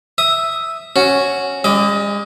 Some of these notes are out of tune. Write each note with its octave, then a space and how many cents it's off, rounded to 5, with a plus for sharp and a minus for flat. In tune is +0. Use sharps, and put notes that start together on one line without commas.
E5 +0 D#6 +0
C#4 +0 F#4 +0
G#3 -45 D#5 +25 D6 +15